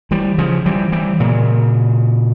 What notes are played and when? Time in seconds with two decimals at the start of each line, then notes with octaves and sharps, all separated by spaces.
0.11 E3 G3
0.38 C#3 F3
0.66 E3 G3
0.92 E3 G3
1.20 A#2 C#3